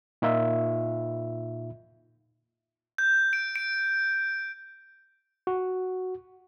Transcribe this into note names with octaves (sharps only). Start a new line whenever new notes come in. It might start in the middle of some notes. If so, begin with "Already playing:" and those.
A#2 D#4 F4 E5
G6
D7
D7
F#4